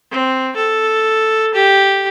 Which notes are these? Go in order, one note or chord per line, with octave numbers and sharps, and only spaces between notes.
C4
A4
G4